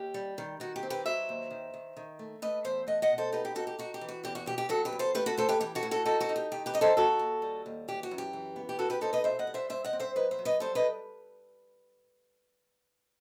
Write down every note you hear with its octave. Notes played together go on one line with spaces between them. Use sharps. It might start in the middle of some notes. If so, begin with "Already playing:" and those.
Already playing: D#2 G4
G3
D#3
D#3 F#4
G4
C4
G4 B4
F#3 C5 E5
D#2
D#3
D#3
D#3
A3
A3 B4 D#5
E2 C5 E5
A3 D#5 F#5
D#5 F#5
B2
A4 C5
D#4 G4 B4
G4
D#4 F#4 A4
G4
D#4 F#4
G4
E3
F#4
E2 G4
F#4
B2 G4
G4
F#3 F#4 A4
G4 B4
E2
A4 C5
A3 G4 B4
F#4 A4
A3 A4 C5
G4 B4
E3 G4
F#4 A4
A2
F#4 A4
D#4 F#4 A4
F#4 A4
D#4
G4
D#3 G4
G4 B4
D#4 D#5
A4 C5
D#2 F#4 A4
D#2
G3
D#2
E3 G4
F#4
F#2
G4
E3
B3
G4
E2 F#4 A4
G4 B4
D#4 A4 C5
B4 D#5
B2 C5 E5
D#5 F#5
G3
C5 E5
G2 C5 E5
D#5 F#5
C4
C5 E5
F#3 B4 D#5
C5 E5
F#3
B4 D#5
G3 A4 C5
B4 D#5